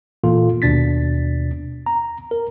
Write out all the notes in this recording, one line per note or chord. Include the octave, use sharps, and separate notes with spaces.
A#2 E3 A#3 F4 A4
D#2 B2 D4 A6 B6
A#5
A#4